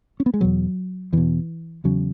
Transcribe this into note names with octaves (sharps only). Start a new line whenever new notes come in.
C#4
B3
G#3
E2 B2 F#3
E2 B2 E3
E2 C#3 F#3